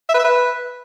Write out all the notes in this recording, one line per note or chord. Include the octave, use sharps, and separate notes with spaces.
E5
B4
E5
B4